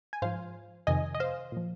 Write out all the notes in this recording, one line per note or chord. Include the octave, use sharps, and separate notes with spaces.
G#5
G#2 F3 C5 F5
F2 C3 D#3 D#5 G#5
D#5
C5 F5
A#2 F3